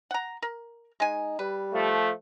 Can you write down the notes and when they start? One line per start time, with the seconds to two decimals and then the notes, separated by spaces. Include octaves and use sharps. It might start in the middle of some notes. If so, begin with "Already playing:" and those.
0.11 F#5 A#5
0.42 A#4
1.00 G#3 D#4 G#5
1.39 G3 B4
1.74 F3 A3